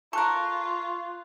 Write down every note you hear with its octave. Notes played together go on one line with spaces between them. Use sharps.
F4 A4 A#4 C#6 F#6